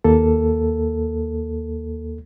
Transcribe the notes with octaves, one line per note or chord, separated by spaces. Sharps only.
D#2 A#3 A4